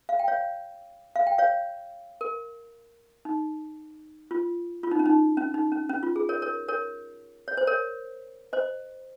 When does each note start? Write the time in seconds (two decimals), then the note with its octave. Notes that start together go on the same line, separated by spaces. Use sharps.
0.09 F5
0.19 G5
0.28 C#5 F5
1.16 F5
1.27 G5
1.38 C#5 F5
2.21 A#4
3.25 D#4
4.31 F4
4.83 F4
4.91 D#4
4.99 C#4
5.06 D#4
5.37 C#4
5.54 D#4
5.72 C#4
5.89 C#4
6.03 F4
6.16 G#4
6.29 A#4 C#5
6.42 A#4 C#5
6.68 A#4 C#5
7.48 C#5
7.57 C5
7.67 A#4 C#5
8.53 C5 D#5